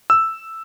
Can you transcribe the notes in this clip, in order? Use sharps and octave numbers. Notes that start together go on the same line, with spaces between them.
E6